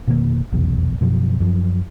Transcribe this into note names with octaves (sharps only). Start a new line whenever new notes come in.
F1 B2 D#3 A#3
F1 B1 E2
F#2 B2 F3
F#2 F3